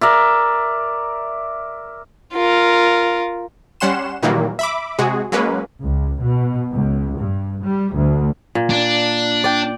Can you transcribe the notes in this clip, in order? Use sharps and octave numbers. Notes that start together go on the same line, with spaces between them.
A#4 D5 E5
F4 A#4
G3 C#4 F#5 C6 E7
A#2 D#3 E3 F#3 G3 A#3
E5 B5 D6
C3 G#3 F#4 G#4
F#3 G#3 A#3 C#4 B4
C#2
B2
C#2
G2
G3
D2
A#2
D4
D5 G5